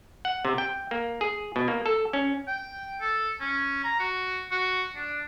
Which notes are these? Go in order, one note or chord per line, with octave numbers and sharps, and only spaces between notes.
F#5
C3
G5
A#3
G#4
B2
A#3
A4
C#4
G5
A4
C#4
A#5
F#4
F#4
D4